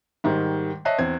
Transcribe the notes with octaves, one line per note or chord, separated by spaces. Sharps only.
G#2 D#3 G3
C#5 D#5 E5 A5 F#6 C7
E2 C4 G#6